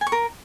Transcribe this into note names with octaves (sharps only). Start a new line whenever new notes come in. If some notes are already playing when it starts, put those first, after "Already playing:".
G#5
C#6
A#4